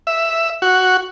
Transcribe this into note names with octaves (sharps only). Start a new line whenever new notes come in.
E5
F#4